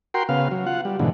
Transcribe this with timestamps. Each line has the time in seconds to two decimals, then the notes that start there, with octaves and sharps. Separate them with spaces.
0.14 F#4 A#4 G5 C6
0.29 C#3 B3 F5
0.51 F#3
0.66 F4 F#5
0.85 G3
0.99 G#2 B2 D3 E3